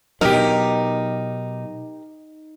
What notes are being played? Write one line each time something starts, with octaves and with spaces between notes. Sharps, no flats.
B2 F#3 D#4 G4 A#4